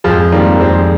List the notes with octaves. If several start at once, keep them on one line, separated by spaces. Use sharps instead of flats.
F2 F3 G#3
D#3 G3 G#3 A#3 C4
F2 G#3 C4